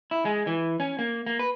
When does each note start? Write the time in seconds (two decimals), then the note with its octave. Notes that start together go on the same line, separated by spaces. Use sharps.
0.11 E4
0.25 G#3
0.47 E3
0.80 C#4
0.99 A#3
1.26 A#3
1.39 B4